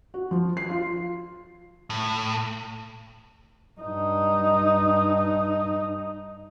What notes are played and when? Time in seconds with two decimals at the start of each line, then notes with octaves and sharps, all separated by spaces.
0.14 F#4
0.31 F3
0.57 C7
0.70 F4
1.90 A2
3.80 G2 D#4